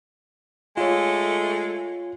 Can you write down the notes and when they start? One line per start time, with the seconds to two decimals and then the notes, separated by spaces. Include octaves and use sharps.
0.77 G#3 A3 F4 C#5